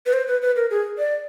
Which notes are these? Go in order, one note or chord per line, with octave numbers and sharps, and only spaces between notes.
B4
C5
B4
B4
A#4
G#4
D5